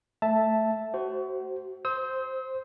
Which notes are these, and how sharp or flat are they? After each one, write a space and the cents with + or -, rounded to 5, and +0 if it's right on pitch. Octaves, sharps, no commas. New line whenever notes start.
A3 +0 E5 +0 A5 +0
F#4 +30 C5 +0
C5 +0 E6 -45